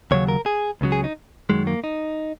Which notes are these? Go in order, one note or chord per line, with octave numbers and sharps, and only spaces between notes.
D#2 C#3 F#3 C#5
A#4
G#4
C#2 C#3 F#3
G#4
D#4
F#2 D#3 F#3 G#3
A#3
D#4